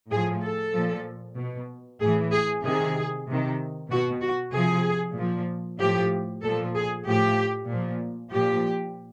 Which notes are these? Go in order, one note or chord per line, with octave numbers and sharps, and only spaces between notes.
A2 F3 G#4
A4
A#2 F3
B2
A2 E3 G#4
G#4
C3 D#3 G#4
C3 D#3
B2 F#4
F#4
C3 F3 G#4
A#2 F3
A2 F3 G4
A#2 F3 A4
G#4
A2 F3 G4
A#2 F3
A#2 F3 G4